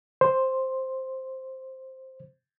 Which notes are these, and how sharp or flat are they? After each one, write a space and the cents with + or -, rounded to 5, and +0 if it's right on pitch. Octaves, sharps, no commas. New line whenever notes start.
C5 +5